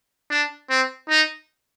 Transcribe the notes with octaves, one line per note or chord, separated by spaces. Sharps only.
D4
C4
D#4